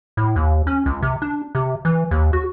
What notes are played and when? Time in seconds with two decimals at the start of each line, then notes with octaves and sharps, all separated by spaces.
0.17 A2
0.36 D#2
0.67 C#4
0.86 C#2
1.02 C3
1.22 D4
1.55 C3
1.85 E3
2.11 D#2
2.33 F#4